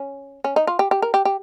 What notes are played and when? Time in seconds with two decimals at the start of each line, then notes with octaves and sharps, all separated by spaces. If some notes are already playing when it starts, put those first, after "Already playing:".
Already playing: C#4
0.44 C#4
0.56 D#4
0.67 F4
0.79 G4
0.91 G4
1.02 A#4
1.14 G4
1.25 G4